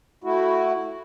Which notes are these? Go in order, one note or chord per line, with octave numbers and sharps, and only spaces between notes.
A3 E4 F#4